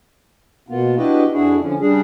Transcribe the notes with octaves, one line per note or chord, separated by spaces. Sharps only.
B2 A#3 B3 F4
D4 E4 F#4 G4 B4 D#5
F2 D4 E4 F#4 G#4
D3 F3 C#4
C#3 G3 D4 G#4